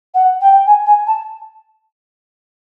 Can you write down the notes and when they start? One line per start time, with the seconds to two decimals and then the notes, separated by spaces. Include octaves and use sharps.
0.14 F#5
0.41 G5
0.66 G#5
0.86 G#5
1.07 A5